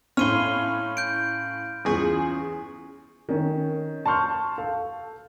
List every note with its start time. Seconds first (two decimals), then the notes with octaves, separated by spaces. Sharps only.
0.17 A2 C#4 F5 C6 C#6 F6 D#7 G7
0.97 G6 D7
1.85 E2 C#4 F4 G#4 C#6
3.29 D#3 C#4
4.06 A5 C6 C#6 F6 G6
4.58 A4 F5